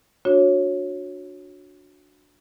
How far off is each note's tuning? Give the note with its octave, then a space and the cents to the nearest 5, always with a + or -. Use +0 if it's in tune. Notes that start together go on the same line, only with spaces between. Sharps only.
D4 +0 F#4 -20 C#5 -10